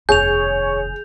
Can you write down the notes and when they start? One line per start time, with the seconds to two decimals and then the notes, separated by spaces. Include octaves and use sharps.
0.09 F1 D#2 G#4 C#5 G6 F7